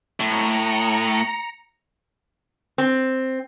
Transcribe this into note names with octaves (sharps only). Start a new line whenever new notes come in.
A2 A#5 C#7
C4